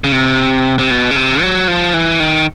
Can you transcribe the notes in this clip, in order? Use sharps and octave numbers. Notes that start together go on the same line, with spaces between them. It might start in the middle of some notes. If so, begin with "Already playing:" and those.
C#3
C3
C3
B2
C#3
C3
F#3
F3
E3
D#3